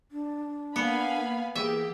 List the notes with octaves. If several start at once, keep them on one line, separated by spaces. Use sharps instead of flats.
D4
A#3 B3 F5 G#5 B5
E3 A#3 G4 G#4 E5